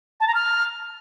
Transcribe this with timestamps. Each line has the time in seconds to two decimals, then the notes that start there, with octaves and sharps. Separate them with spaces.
0.20 A5
0.27 A#5
0.34 F6